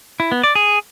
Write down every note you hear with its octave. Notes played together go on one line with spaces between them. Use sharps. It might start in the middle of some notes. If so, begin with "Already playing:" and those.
E4
B3
D5
G#4